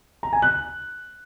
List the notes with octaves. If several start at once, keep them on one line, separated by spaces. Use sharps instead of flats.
A#5
G#5
F#6